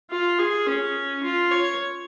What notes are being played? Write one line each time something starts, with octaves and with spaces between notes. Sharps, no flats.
F4
G#4
C#4
F4
C#5